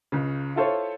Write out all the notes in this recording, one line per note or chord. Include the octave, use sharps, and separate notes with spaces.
C#2 C#3
E4 F4 A4 C5 C#5